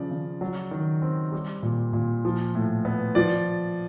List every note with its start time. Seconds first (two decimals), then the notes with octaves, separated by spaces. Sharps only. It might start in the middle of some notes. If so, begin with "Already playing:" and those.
Already playing: C#3 F3 D5
0.11 C#3
0.41 F#3
0.71 D#3
1.02 C4
1.32 G3
1.63 A#2
1.93 A#2
2.25 F3
2.55 A2
2.85 B3
3.15 F3 D5